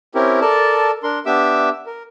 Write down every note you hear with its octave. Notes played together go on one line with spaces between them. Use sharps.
C4 C#4 E4 G4 A#4
A4 A#4 D5 A5
D4 A#4 C6
B3 D4 G4 E5 D6 E6
A#4